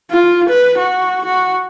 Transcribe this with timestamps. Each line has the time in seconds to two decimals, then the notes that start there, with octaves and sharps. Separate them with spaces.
0.11 F4
0.50 B4
0.78 F#4
1.26 F#4